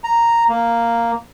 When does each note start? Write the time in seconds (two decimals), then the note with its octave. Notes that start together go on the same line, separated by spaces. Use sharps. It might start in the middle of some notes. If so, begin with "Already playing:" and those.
0.04 A#5
0.49 A#3